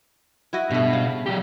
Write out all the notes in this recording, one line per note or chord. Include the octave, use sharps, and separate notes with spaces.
E4 F#4 D#5
G2 B2 A3
C#3
F#3 G4